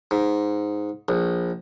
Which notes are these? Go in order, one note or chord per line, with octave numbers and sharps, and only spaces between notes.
G#2
A#1